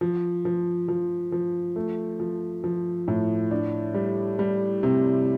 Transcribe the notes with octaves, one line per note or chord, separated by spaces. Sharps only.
F3
F3
F3
F3
A3
F3
F3
A2
D4
G3
G3
C3